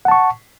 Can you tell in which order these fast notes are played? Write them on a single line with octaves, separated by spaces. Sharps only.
F#5 A5 C#6